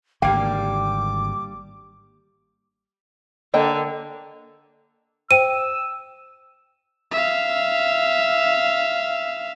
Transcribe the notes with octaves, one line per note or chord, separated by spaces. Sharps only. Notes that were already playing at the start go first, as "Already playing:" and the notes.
G#1 D3 G3 A#3 F5 G5 D6
D3 A#3 D#5 G5
C5 G5 E6 D#7
E5 F5